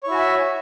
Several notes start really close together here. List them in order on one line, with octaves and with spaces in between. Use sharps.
C#5 E4 F#4 G#5 E5